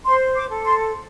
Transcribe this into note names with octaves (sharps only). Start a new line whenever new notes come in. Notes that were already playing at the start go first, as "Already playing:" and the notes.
C5 C6
D6
A4
C6